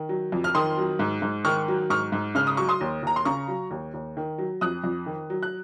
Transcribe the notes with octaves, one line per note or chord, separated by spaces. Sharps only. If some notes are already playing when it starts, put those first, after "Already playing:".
Already playing: D#3
F#3
F2
F6
D#3 C6 D#6
F#3
G#2
G#2
D#3 C#6 F6
F#3
G#2 C#6 F6
G#2
C#3 F6
D#6
F#3 C#6
C6 D#6
D#2
D#2 A#5
C6
C#3 A#5 C#6
F#3
D#2
D#2
D#3
F#3
F2 D#6 F#6
F2
D#3
F#3
F#6